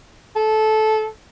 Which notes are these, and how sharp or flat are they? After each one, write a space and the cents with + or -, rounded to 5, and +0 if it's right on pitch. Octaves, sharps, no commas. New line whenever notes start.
A4 -15